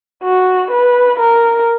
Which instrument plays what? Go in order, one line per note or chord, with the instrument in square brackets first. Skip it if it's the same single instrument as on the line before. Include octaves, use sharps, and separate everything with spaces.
[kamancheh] F#4
B4
A#4